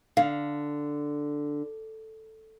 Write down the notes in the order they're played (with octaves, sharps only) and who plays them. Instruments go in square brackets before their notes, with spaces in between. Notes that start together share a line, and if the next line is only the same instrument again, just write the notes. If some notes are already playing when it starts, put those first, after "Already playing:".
[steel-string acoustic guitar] D3 [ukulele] F5